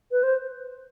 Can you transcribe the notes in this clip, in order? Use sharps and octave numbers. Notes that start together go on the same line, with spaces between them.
B4
C5